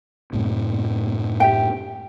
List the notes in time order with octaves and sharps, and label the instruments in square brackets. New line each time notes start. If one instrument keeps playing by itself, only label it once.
[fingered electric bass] F#2 A2 C3
[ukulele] G4 E5 G5